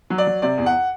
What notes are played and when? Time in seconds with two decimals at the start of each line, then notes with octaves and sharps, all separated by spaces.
0.10 F#3
0.18 D5
0.27 F#3
0.42 C3 D5
0.58 E2
0.66 F#5